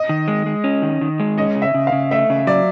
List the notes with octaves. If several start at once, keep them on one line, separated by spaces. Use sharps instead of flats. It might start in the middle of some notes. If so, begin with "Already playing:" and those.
Already playing: D#5
D#3
G#3
G#3
C#4
D#3
D#3
G#3
C#4 D#5
C#3
E5
C#3
F5
C#3
A3 E5
C#3
F#3 D5